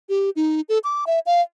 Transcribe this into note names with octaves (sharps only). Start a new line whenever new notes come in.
G4
D#4
A4
D6
E5
F5